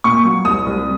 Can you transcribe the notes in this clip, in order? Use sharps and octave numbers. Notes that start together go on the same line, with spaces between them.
A#2 C#6
F#3
C2 D#6
C2